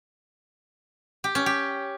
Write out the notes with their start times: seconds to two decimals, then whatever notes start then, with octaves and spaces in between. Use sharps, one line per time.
1.24 G4
1.35 C#4
1.46 G4